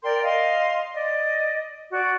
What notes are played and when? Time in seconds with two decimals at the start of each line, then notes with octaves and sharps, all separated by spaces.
0.03 A#4 D5 G5 C6
0.24 D#5 F5 C6
0.94 D5 D#5
1.91 F#4 D5